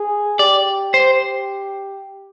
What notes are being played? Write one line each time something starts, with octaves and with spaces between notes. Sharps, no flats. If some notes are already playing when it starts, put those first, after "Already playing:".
Already playing: G#4
G4 D5
C5